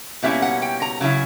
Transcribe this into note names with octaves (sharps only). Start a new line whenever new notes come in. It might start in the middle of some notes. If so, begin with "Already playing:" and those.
B2 G3 A#3 C#4 E4 E5
F#5
G5
A#5
C#3 F#3 C#4 E4